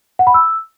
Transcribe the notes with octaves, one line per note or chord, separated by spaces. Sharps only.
F#5
B5
E6